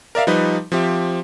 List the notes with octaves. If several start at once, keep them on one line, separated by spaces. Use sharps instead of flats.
A#4 D5 E5 F5
F3 G3 D#4 B4
F3 C4 G4 E5